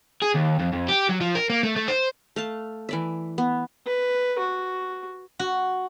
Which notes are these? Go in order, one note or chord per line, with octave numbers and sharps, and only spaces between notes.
G#4
D#2
F2
F2
G4
F#3
F3
A#4
A#3
A3
A3
C5
A3 F5 A5
E3 D5 E5
B3
B4
F#4
F#4